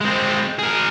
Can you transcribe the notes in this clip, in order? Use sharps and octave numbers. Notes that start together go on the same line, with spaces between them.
G#3 C4
G#4 A#4